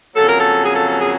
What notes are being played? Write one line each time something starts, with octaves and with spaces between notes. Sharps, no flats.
F2 C#3 F#3 A#3 A4
A#4
A4
G#4
A4
A4
G#4